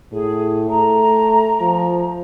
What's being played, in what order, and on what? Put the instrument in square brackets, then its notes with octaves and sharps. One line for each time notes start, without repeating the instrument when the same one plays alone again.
[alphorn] A2 [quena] G#4
[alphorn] A3 [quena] A#5
[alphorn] F3